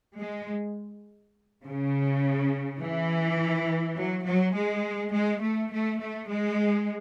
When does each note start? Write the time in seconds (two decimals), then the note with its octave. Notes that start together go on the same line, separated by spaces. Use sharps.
0.19 G#3
1.65 C#3
2.80 E3
3.97 F#3
4.25 F#3
4.54 G#3
5.12 G#3
5.41 A3
5.70 A3
5.99 A3
6.28 G#3